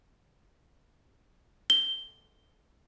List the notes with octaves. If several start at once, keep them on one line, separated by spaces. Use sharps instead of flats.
G7